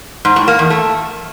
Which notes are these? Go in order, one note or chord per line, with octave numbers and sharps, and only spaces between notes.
G#2
A2
A#3
E2
A3